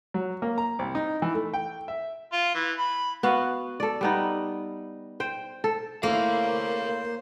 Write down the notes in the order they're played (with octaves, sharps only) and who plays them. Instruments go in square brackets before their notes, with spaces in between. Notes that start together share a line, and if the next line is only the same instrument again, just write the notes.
[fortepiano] F#3
A#3
A#5
C2
D#4
E3
A3
G5
E5
[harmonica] F4
E3
B5
[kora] B3 F#4 F5
A4 D5
G3 B3 D#4
C5 G5
A4
[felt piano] A3 E4 [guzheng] A#3 [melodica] C5 [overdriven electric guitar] C#5 F5